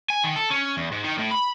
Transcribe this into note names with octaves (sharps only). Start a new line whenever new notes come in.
G#5
D#3
A4
C#4
E2
G#2
D#3
A2
B5